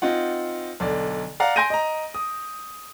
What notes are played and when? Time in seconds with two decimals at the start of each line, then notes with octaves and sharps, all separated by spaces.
0.02 C4 D#4 F4 F#5
0.80 B1 D3 D5
1.40 D5 F5 F#5 A#5
1.56 G#5 C6 G6 A#6 D7 D#7
1.70 D#5 A#5
2.14 D#6